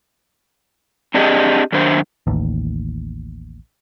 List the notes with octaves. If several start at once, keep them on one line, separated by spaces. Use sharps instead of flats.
C4 D4 G4 G#4 C5 D#5
F#2 D#3 D4 C5
A1 D#2